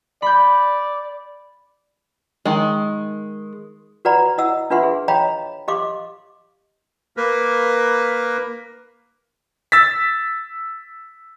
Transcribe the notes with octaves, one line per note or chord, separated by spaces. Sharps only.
D5 B5 G6
D#3 G#3
F#4 B4 D5 F#5 A#5 B5
E4 D#5 F#5 E6
D4 F4 B4 E5 F#5 C6
G#4
C#5 D#5 F5 G5 A#5 B5
G4 D#5 F5 C6 D6
A#3 A#4 B4
E6 A6 B6